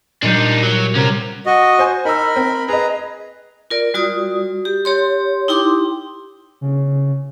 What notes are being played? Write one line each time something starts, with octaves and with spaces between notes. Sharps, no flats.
A#2 G3 D4 D#4 G6
F#3
C3 C#4 A#4
F#4 D#5
C5 G#5
D#4 A#4 B5 E6
C4
G#4 B4 D#5 A#5
F4 A#4 D5
G3 F4 F#4 D5 D#6
G4
G4 C#5 C6
D#4 E4 G4 G5 C6 D6
C#3